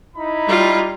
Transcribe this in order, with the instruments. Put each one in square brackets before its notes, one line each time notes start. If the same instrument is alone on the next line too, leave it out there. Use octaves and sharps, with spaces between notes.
[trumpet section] D#4 E4 B5
[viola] G3 F4